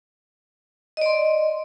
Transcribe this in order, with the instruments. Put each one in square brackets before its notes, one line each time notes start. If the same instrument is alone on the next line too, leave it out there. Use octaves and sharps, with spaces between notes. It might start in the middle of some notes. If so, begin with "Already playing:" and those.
[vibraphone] D#5
D5
C6